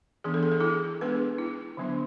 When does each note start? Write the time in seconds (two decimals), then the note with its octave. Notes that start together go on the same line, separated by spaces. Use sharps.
0.24 E3 B3 D4 G#4
0.34 A4
0.43 G#4
0.52 A4
0.60 E4 G#4
1.01 G#3 B3 D4 G#4 B4
1.38 E4
1.77 D3 F#3 B3 D4